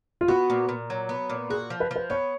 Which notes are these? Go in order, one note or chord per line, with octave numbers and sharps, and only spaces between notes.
F4
B3 F#4
A#2
A#2
F#3
B3
A#2
F#4 G#4
F3
B4
F3 B4
B3 C#5